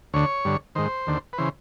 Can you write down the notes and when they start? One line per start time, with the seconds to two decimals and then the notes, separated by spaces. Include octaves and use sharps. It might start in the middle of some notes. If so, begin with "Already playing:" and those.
0.13 D2 D3 C#5
0.45 G2 D3
0.75 G#2 D#3 C5
1.07 D#2 D3
1.33 B4
1.38 C#3 E3 C5